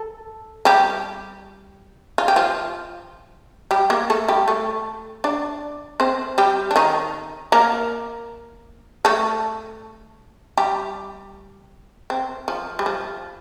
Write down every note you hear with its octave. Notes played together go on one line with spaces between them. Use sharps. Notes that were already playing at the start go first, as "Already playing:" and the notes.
Already playing: A4
G3 G4
F4
G4
F3 F4
G3 G4
A#3 A#4
A3 A4
G3 G4
A3 A4
D4 D5
C4 C5
G3 G4
D4
D#3 D#4
A#3 A#4
A3 A4
G3 G4
C4
F3
G3
F3